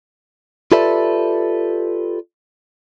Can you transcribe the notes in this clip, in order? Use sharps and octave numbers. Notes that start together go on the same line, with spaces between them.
F4 G4 A4 B4 D5 E5